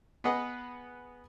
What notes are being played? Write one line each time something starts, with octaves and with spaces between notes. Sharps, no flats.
B3 G#4 B4 D#5 F#5